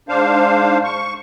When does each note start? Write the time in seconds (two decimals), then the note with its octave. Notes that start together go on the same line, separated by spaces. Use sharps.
0.09 G#2 D4 C5 F5
0.84 C#6